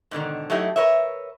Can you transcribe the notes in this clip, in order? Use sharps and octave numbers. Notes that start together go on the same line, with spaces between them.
G#2 B2 D3 D#3
F#3 A3 D#4 E4 G4
A#4 B4 C#5 E5